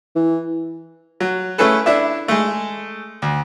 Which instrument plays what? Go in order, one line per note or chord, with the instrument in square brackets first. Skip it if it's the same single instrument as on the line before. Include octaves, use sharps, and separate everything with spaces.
[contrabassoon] E3
[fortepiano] F#3
A3 C#4 E4 G#4 A4 B4
D4 E4 D5 E5
G#3 A3
D2